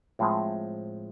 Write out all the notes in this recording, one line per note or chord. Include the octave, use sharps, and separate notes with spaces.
A2 F3 G#3 C4